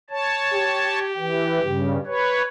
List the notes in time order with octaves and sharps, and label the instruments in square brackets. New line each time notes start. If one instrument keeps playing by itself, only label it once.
[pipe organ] C#5 A5
[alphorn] G4
[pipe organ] E3
G2 C#3
B4 C#5